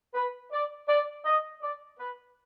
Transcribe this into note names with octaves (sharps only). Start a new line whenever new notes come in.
B4
D5
D5
D#5
D5
B4